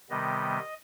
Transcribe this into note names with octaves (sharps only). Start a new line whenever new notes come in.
C3 D#3 G3 B3 D#5